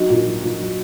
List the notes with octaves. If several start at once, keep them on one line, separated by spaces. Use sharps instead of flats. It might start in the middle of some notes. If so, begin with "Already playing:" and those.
Already playing: F#3 D#4 F#4
A#2
F#3
A#2
F#3